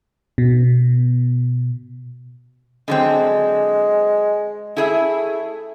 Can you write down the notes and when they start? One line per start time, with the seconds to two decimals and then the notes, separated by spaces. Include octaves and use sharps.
0.38 B2
2.88 D3 F#3 G#3 C4
4.77 A3 E4 G#4 E5